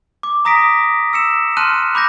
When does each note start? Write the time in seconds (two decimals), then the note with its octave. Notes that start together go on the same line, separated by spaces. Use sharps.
0.23 D6
0.45 A#5 D#6 A#6 B6 D7
1.13 E6 C#7 E7
1.57 A5 C6 F6 F#6 D#7
1.95 B5 D6 G6 A#6